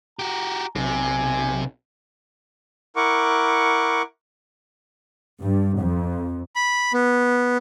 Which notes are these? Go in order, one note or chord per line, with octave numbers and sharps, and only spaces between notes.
F#4 G4 A#5
B1 C3 G#5
E4 A#4 F#5 C#6 D6
G2
F2
B5
B3